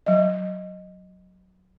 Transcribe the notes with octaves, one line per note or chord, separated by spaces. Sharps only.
F#3 D#5